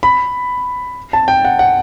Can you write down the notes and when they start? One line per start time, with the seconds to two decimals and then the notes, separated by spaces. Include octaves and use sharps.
0.03 B5
1.13 A5
1.28 G5
1.45 F#5
1.59 F#5